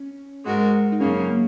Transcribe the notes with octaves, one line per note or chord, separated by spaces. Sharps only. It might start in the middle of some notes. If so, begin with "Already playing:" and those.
Already playing: C#4
G#2 G#3 F#4 A#4
D#4
F#2 C#3 A#3 C#4
C#4
A#3